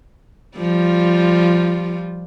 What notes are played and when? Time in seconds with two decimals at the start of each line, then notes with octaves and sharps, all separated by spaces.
0.58 F3 G3 F4